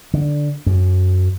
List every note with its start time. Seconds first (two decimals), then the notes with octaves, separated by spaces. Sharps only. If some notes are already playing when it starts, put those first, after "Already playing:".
0.14 D3
0.66 F#2